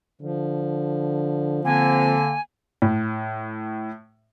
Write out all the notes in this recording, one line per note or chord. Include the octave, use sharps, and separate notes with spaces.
D3 F3
D3 A#3 C4 G#5
A2